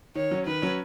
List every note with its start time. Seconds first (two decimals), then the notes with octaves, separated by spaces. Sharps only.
0.15 D#3 C#5
0.31 F#3 C#4
0.46 D#3 B4
0.62 F#3 C#4